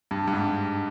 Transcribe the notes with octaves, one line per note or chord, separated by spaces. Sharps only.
G2
G2
G#2